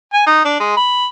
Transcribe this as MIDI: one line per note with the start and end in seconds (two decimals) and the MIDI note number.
0.13 0.24 80
0.27 0.42 63
0.45 0.58 62
0.60 0.75 56
0.77 1.07 83